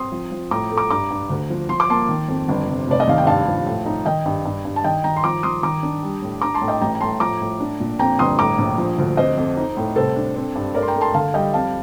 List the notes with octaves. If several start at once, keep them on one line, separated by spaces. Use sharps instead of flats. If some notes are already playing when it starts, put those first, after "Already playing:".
Already playing: C4 C6 D#6
F3
F3
A2 A#5 D6
A3
A#5 D6
G2 A#5 D6
G2
D2
F3
F3 C6
D6
A#3 A5 C6
D#3
F2
G1
C3
F1 D5
D#5
D#2 F5
G5
G2 F5 A5
F3
A2
D#4
D#3 D#5 G5
G2
G2
G2
A5
D#3 D#5 G5
D#3 G5 A#5
C6
F3 A#5 D6
F3 C6 D#6
D#3 A#5 D6
D4
G3
A2
D4 A#5 D6
A5 C6
A2
D#5 G5
A1 G5 A#5
A#5
A2 A5 C6
F3 A#5 D6
A2
D4
A#2
F2 G5 A#5
G1 C6 D#6
A2 A#5 D6
A#1
F3
D2
F2 C5 D#5
F2
D#4
A2
C2 A4 C5
D4
C4
G2
A3 A#4 D5
C6
G5 A#5
A3
A5 C6
D3 F5 A5
G3 D#5 G5
F2 F5 A5